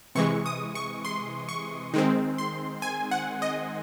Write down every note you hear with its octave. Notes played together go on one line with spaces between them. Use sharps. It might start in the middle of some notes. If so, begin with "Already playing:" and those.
C3 E3 G#3 C#6
D#6
C#6
C6
C#6
D#3 G#3 C4
C6
G#5
F#5
D#5